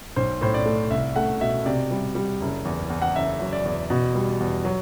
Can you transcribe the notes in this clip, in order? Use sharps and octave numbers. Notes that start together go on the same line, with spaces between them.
B1 C5
A2 C5
D5
A3
C2 E5
A3 F#5
B2 E5
C3 D5
G3
G3
F#1
E2
E2
F#5
F#1 E5
F#3
D5
E2
B2
G3
E2
F#3